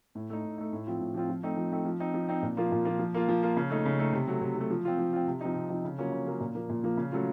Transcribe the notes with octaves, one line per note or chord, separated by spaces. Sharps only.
A2
A3 D#4
A2
A3 D#4
A2
F3 C4 F4
A2
F3 C4 F4
F3
A3 C4 D#4
F3
A3 C4 D#4
F3
C4 D#4
F3
C4 D#4
A#2
F3 A#3 F4
A#2
F3 A#3 F4
F3
A#3 F4
F3
A#3 F4
C#3
A3 D#4
C#3
A3 D#4
C3
F#3 A3
C3
F#3
A3
F3
C4 F4
F3
C4 F4
C3
F3 C4 D#4
C3
F3 C4 D#4
C#3
F#3 A#3 C#4 F4
C#3
F#3 A#3 C#4 F4
A#2
F3 A#3
A#2
F3 A#3
C#3
F#3 A3 C#4 F4